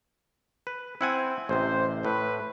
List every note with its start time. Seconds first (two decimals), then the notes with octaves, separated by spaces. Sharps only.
0.67 B4
1.01 C4 E4 F#5 G#5
1.49 A1 C3 C5
2.05 A2 B4